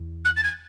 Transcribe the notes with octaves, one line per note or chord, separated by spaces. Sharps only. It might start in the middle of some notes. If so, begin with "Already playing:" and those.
Already playing: E2
F#6
A6
G#6